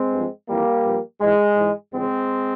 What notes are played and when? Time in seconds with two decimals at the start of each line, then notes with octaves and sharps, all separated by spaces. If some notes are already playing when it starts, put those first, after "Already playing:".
Already playing: G#3 C4
0.12 G2 F3
0.48 F2 E3 G3 A#3
0.84 G2 F3
1.20 G#2 E3 G#3
1.57 G#2 E3
1.92 E2 C#3 F3 G#3 C4